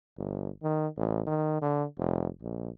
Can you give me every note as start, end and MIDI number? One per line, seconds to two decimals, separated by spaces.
0.18 0.50 31
0.63 0.87 51
0.97 1.22 33
1.27 1.61 51
1.62 1.84 50
1.98 2.28 29
2.42 2.70 34